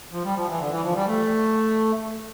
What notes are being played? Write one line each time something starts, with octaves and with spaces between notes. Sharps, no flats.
F3
G3
F3
E3
D3
E3
F3
G3
A3